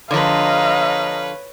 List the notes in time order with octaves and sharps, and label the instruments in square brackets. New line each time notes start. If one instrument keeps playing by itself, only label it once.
[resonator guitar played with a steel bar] D3 F3 [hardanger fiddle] B4 C#5 [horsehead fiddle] D#5 A#5 [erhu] F5